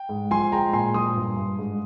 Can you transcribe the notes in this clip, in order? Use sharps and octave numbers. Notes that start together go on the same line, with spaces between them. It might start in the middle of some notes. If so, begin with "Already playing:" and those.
Already playing: G5
G#2
F3 G#5 C6
G#3 G5 A#5
A#2 G#5 C6
F3 C6 D#6
G2
G2
G#2